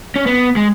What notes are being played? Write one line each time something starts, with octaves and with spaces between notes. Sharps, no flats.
C#4
B3
G#3